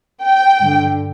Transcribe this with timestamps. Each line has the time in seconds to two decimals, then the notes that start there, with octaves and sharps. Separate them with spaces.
0.23 G5
0.61 G2 D3